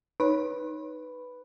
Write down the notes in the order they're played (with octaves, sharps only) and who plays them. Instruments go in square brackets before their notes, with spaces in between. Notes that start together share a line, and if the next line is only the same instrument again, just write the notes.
[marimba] D#4 C#5 [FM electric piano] B4